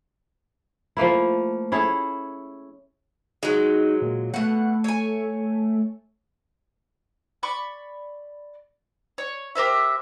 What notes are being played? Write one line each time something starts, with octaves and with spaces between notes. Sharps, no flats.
F3 A3 A#3 E4
C#4 E4 G#4 A4
F#3 G#3 D#4
A#2
B2 A3 F#5
C#5 G#5
D5 B5 C#6
C#5
G4 A#4 C5 E5